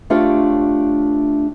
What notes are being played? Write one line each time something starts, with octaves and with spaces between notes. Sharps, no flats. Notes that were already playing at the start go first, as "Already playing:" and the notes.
A3 D4 F4 G4 C#5